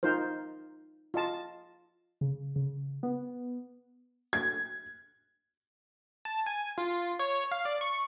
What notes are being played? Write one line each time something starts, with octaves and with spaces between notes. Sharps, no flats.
D#4 F4 A#4 C5
F4 D#5 A5
C#3
C#3
B3
G#6
A5
G#5
F4
C#5
F5
D5
C#6